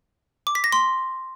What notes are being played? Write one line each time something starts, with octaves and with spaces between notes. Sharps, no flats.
D6
B6
A#6
C6